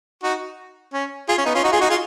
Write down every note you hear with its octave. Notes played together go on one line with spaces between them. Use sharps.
D#4 F#4
C#4
F4 G#4
C#4
B3 D#4
C#4 F4
D#4 F#4
F4 G#4
D#4 F#4
F4 G#4